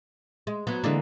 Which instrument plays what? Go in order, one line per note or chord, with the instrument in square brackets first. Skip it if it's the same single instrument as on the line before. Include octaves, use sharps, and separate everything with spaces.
[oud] G#3
F#3 B3
[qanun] D3 E3 A#3 [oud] G#3 D4